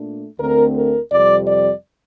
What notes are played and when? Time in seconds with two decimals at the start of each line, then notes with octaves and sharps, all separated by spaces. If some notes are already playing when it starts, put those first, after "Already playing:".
Already playing: A#2 A3 D4
0.39 D2 D3 A3 C4 A#4
0.76 A#4
1.12 F2 C3 G3 D5
1.48 D5